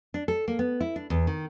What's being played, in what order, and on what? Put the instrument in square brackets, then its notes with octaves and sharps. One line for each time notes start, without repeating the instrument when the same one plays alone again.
[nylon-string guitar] D4
A4
A#3
B3
E4
D4
E2
D#3